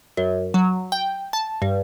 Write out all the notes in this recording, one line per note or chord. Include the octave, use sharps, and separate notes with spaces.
F#2
F#3
G5
A5
G2